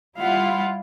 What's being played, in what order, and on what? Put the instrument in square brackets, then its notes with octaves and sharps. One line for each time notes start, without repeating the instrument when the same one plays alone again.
[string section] G3 E4 F4 [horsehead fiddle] F5 F#5